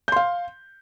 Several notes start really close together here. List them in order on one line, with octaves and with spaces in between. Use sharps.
G6 C6 F5